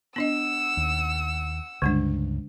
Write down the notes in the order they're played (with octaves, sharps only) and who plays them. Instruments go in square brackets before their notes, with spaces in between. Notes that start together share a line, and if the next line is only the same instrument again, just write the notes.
[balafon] B3 D4 D#5 [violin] F#5 E6
[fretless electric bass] D#2
[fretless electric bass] C#2 G2 [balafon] D3 G#3 D4